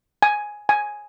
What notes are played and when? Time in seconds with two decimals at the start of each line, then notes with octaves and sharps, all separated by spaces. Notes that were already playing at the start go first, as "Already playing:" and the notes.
0.22 G#5
0.69 G#5